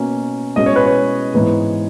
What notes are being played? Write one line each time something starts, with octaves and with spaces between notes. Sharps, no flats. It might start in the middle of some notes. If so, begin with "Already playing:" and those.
Already playing: B2 A#3 C#4
B2 G#3 C#4 D#5
C#5
B4
C#5
G#2 E3 B3